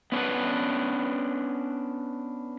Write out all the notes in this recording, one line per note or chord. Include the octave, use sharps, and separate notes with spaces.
B3 C#4 D4 B4